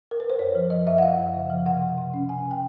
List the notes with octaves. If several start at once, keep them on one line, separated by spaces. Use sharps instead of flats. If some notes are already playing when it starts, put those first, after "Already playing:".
A#4
B4
C5
F#2 C#5
F3
F3 D#5
F#2 E5
F#5
F#2 F5
F#2
C#3
F3
C3 F#5
C3
C3
C#4
C3 G#5
C3
G5